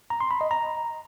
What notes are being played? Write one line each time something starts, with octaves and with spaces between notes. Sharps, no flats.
A#5
C6
B5
D#5
A#5